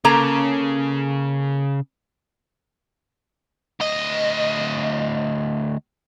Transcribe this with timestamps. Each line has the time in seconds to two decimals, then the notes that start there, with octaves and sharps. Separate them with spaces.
0.05 C#3 A#3 A4 A#5
3.80 D2 D#5